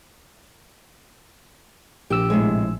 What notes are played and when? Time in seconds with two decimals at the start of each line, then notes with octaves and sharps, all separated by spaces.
2.10 A#1 G4 E6
2.30 A2 C3 G#3